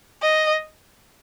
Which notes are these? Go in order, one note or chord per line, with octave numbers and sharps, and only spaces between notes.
D#5